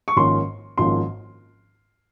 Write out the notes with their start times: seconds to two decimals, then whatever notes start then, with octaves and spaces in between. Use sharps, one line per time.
0.08 C#6
0.16 G#1 G#2 F3 A#3 C#4 C6
0.78 G#1 G#2 F3 A#3 C#4 C6